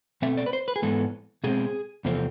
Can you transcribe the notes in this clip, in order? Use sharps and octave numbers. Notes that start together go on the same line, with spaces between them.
B2 A3 C4 E5
D5
B4
C5
B4
G#4
G#2 E3 G#3 B3 A4
B2 G#3 C4 G#4
E2 C3 F3 A3 C4